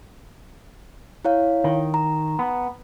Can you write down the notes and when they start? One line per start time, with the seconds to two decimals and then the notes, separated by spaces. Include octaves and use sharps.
1.25 E4 C#5 F5
1.64 D#3
1.94 A#5
2.39 B3